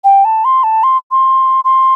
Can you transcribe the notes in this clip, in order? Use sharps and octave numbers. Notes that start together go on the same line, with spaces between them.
G5
A5
C6
A5
C6
C6
C6